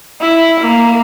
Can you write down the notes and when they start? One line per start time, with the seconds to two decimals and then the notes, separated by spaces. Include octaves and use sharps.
0.21 E4
0.60 A#3